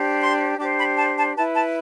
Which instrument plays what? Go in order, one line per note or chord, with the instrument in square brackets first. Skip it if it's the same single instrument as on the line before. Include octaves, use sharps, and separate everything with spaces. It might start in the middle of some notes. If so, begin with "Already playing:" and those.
Already playing: [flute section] D4 G4 C5
C6
D4 G4 C5 D6
B5
A5
A5
B4 A5
E4
A5